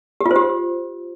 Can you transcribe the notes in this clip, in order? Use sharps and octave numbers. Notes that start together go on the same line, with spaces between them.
G4
F4
C5
G4